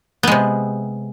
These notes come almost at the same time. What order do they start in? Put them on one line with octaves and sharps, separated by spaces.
B3 G#3 C3